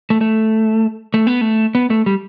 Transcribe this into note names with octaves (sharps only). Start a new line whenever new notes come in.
A3
A3
A3
B3
A3
B3
A3
G3